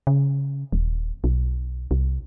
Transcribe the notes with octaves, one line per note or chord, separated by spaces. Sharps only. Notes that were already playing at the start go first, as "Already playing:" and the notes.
C#3
D#1
B1
C2